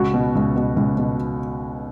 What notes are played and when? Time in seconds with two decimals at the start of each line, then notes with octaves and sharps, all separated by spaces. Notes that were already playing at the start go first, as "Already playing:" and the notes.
Already playing: C#2 F#4
0.14 B2
0.35 C#2
0.56 B2
0.77 C#2
0.98 B2